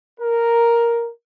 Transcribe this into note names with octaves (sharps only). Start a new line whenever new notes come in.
A#4